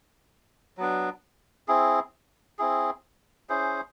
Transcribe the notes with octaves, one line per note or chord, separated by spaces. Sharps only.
F#3 B3 D4
C4 E4 G#4
C4 E4 G#4
C#4 E4 G#4 C5